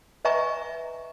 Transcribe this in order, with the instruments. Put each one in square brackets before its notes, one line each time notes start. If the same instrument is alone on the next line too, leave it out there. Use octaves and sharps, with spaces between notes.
[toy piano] B4 D#5 E5 G#5 A#5 C#6